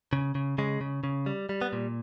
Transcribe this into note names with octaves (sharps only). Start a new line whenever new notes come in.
C#3
C#3
C#3 G#3
C#3
C#3
G3
G3
B3
A#2